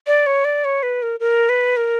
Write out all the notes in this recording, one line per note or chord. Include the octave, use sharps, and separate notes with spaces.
D5
C#5
D5
C#5
B4
A#4
A#4
B4
A#4